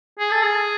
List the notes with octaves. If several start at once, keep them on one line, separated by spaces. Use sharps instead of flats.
G#4
A4
G#4